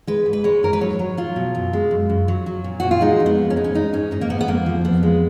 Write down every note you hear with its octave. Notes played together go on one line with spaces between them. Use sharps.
G#3 B4
G#2
B4
G#3 C#5
G#2 A#4
B4
F#3 C#5
F#3
F#3 F4
B2
F#2
G#3
F#2
F#2
F#3
F#3
A#2
A#2 F#4
F4
G#3 D#4
F2
B3
F2
C#4
G#3 D#4
C#4
G#3 D#4
G#2 C#4
G#2 D#4
A#3
G#2 B3
B3
F2 A#3
F3
F2 B3
G#3